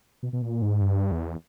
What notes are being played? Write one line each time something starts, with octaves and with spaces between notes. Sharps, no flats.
B2
B2
A#2
G#2
G2
E2